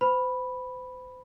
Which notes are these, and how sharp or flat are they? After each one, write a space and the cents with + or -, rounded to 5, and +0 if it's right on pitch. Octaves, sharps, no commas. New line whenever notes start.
C5 -40 B5 +0